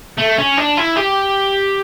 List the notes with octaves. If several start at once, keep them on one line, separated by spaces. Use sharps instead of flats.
A3
C#4
D4
E4
G4